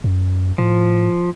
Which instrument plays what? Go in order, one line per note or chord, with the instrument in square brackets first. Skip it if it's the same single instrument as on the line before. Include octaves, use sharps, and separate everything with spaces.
[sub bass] F#2
[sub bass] A2 [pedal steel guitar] F3